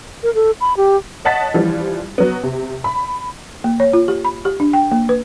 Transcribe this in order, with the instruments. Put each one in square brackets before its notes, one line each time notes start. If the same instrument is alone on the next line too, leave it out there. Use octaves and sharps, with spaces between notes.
[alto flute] A#4
A4
B5
G4
[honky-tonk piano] C#5 D#5 F#5 A5 A6 B6
E3 F3 G3
F#3 B3
C3
B5
[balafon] A#3
C#5
F4
G4
B5
G4
D4
G5
A#3
B4